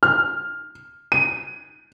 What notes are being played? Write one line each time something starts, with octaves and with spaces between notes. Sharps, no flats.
F6
D#7